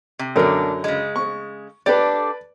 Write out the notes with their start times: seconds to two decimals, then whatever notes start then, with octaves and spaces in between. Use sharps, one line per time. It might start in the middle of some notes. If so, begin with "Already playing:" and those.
0.19 C3
0.36 F#2 B2 D3 D4 A#4
0.84 C#3 G#3
1.16 C#6
1.86 D4 G4 A4 B4 D5